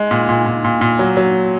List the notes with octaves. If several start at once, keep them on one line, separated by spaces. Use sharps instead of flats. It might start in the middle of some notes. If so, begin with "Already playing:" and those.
Already playing: G#3
A#2
A#2
A#2
A#2
A#2
F#3
F#3